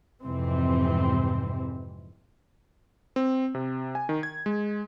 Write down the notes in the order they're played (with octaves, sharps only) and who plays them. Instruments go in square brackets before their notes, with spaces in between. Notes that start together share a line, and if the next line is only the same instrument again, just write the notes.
[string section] F2 G#2 C3 E3 C4
[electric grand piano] C4
C3
G#5
D#3
G#6
G#3